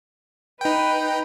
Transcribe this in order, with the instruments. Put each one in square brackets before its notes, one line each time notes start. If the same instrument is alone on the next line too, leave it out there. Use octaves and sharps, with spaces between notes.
[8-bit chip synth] D#4 G5 [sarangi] B4